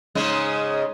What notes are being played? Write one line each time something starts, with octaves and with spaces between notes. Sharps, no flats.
G#2 C#3 G#3